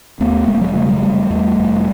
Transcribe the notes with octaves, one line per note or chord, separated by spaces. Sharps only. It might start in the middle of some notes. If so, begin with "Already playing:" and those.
D#2 A3 B3
E1 G#3 A#3
F#3 G#3
C#3 G3 A3
F#3 G#3
F1 G3 A3
E2 G3 A3
F1